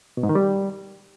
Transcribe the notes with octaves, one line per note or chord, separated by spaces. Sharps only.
B2
G#2
D#3
G3